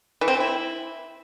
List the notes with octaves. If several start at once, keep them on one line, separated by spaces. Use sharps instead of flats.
E3
C4
E3
E4